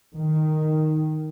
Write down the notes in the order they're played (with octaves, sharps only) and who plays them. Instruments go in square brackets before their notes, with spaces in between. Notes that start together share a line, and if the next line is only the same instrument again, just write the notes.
[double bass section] D#3